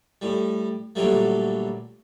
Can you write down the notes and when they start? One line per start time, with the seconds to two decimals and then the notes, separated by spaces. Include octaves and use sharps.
0.22 A2 G3
0.96 A#2 D3 F#3 G3 A3